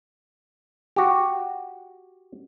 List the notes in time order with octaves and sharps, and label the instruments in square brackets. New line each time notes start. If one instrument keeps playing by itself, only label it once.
[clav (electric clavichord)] F#4 G4